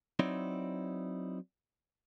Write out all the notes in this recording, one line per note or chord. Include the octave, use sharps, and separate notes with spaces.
F#3 C4 D#4 E4 C#5 D5